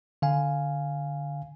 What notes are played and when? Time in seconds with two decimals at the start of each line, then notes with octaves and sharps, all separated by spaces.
0.22 D3 F5 G#5